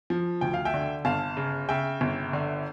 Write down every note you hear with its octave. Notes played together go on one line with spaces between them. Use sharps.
F3
D2 G5
F5
E5 G5
D3
G1 F5 A5
C#3
C#3 E5 G5
G1
D3